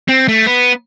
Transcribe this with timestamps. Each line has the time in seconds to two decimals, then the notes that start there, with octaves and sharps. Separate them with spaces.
0.09 C4
0.28 A3
0.46 B3